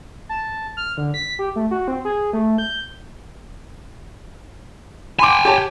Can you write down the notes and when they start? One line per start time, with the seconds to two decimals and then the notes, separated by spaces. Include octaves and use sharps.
0.29 A5
0.77 F6
0.97 D3
1.14 B6
1.39 G4
1.56 A3
1.71 F#4
1.88 C4
2.05 G#4
2.33 A3
2.58 G6
5.19 G5 G#5 B5 C6 D6
5.45 G4 C#5 A5